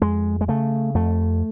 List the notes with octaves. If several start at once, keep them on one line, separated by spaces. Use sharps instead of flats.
F2 G#3
G#3
C#3 A3
F2 A3